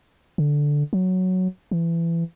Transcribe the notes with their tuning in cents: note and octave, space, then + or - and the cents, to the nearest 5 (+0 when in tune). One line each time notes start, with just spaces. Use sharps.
D3 -5
F#3 +0
E3 +25